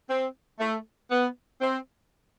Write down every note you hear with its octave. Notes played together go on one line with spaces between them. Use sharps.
C4
A3
B3
C4